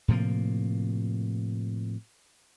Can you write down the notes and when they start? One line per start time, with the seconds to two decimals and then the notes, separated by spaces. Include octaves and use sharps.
0.08 A2 C3 F3 A#3